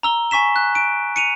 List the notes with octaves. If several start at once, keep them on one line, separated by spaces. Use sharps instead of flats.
A#5 E6 G7
G#5 C#6 B6 E7
F#6
D7
C#7 D#7 F7